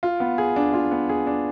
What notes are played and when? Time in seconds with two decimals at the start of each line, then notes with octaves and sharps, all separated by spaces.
0.03 F4
0.20 B3
0.38 G#4
0.56 D4
0.73 F4
0.91 B3
1.09 G#4
1.27 D4